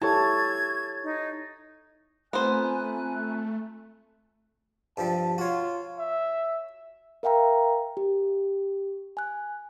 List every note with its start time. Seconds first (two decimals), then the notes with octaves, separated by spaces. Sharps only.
0.02 E4 G4 A4 C#5 A5 G#6
1.04 D#4
2.33 A3 B3 C4 F4 C5 G#5 A#5 F#6
4.97 G2 F3 G3 A5
5.38 F4 F#4 C#5
5.99 E5
7.23 A#4 E5 F5 G5 A#5
7.97 G4
9.17 G#5 F#6